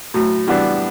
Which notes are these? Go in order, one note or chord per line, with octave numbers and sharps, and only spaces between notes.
A2 F#3
E3 G3 B3 D4